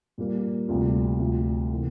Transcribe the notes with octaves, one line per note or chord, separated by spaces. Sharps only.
A#2 G3 A#3
D2 C3 G3 C4 F4
D2 C3 F3 C4 F4
C3 E3 A#3